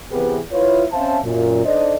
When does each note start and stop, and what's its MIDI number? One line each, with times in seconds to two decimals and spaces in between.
0.11 0.39 48
0.11 0.39 52
0.11 0.39 59
0.11 0.39 67
0.11 0.39 68
0.11 0.39 71
0.52 0.84 64
0.52 0.84 65
0.52 0.84 71
0.52 0.84 73
0.92 1.18 60
0.92 1.18 61
0.92 1.18 72
0.92 1.18 76
0.92 1.18 77
0.92 1.18 81
1.24 1.65 42
1.24 1.65 46
1.65 1.95 62
1.65 1.95 63
1.65 1.95 69
1.65 1.95 72
1.65 1.95 74
1.65 1.95 75